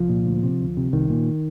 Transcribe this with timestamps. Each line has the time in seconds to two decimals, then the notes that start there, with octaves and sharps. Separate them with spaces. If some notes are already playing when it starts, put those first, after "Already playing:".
Already playing: C2 F3
0.09 A#2
0.26 D2
0.43 C3
0.60 D2
0.77 C3
0.93 C2 D#3
1.10 A#2